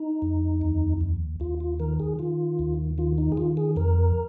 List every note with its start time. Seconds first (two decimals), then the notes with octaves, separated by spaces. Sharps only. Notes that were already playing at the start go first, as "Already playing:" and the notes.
Already playing: D#4
0.22 F2
0.61 D#2
1.01 D#2
1.40 D#2 F4
1.60 F4
1.80 D#3 A#4
2.00 G#4
2.19 D#3 F4
2.59 D#2
2.98 D#3 F4
3.18 D#4
3.32 G#4
3.37 D#3 F4
3.57 G#4
3.76 F2 A#4